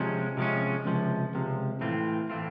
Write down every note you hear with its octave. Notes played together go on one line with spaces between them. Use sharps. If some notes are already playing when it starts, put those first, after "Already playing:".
Already playing: C3 F3 G#3 C#4
C3 F3 G#3 C#4
C#2 C3 F3
C#2 C3 F3
A2 E3 A3 C4 F4
A2 E3 A3 C4 F4